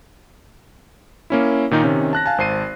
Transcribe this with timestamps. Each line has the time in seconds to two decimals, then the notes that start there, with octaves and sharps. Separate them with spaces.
1.30 A#3 C#4 E4
1.71 A#2 D#3 D#4
1.84 C3 D#3 C#4
2.13 A5 F#6 A#6
2.26 F5 G#5 A5
2.38 G#1 C5 A5 C7 D#7